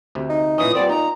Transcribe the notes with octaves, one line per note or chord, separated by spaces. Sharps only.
D2 C3
D#4
A#2 E3 C#4 D#6
A#2 G3 B3 C4 D5
D#4 A#5